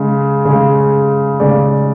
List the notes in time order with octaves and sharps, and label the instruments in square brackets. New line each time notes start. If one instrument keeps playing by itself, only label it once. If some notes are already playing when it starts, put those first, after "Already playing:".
Already playing: [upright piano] C#3 G#3
C#3 G#3
C#3 G#3 D5